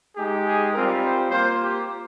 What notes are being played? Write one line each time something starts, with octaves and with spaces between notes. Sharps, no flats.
G#3 D#4 G4 G#4
G#4
G3 C4 F4 A#4
C5
A#3 F4 C5
G4